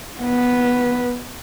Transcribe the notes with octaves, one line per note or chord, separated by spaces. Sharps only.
B3 B4